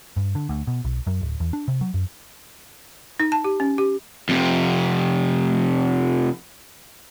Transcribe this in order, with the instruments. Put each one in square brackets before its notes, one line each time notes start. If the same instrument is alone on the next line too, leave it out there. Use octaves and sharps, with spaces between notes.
[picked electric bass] G2
D3
D2
B2
B1
F#2
D1
E2
D4
C3
F#3
F#2
[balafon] D#4
A5
G4
C#4
G4
[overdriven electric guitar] F2 C3